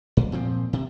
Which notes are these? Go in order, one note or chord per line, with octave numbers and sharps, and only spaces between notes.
G2
A#2 F3 C4
C3